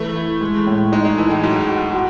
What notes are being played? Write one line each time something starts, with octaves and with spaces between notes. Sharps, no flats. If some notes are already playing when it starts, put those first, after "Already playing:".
Already playing: E3 A3
E4
G#3
A2
G#3 D#4
G#3
E3 A4
A2
G#2 F#3
F#4
A2
F#4